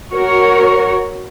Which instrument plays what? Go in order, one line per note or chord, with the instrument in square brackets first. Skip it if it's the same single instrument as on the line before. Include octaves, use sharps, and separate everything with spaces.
[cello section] F#4 A#4 C#5